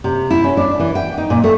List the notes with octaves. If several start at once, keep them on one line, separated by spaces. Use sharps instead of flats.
C3
E4
C#4
D4
E3
G5
D#4
A#2
A3